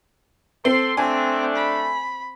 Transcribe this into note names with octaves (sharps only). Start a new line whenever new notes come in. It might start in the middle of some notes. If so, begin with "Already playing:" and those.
C4 A4 C6
A3 C4 D4 G#5
B5